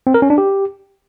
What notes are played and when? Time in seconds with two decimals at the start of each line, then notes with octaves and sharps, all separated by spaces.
0.07 C4
0.14 A#4
0.22 C#4
0.30 D4
0.38 G4